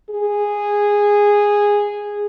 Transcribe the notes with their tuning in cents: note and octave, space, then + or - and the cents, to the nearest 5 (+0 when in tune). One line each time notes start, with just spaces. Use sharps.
G#4 -10